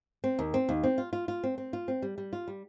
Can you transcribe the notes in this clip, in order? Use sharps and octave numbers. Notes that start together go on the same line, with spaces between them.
C4
D#2
C4
D#2
C4
F4
F4
F4
C4
C4
F4
C4
G3
G3
F4
G3